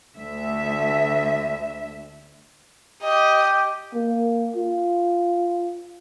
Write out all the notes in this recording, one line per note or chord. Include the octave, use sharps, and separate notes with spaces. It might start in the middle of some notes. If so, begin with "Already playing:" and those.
D2 E5
G4 D#5
A#3
F4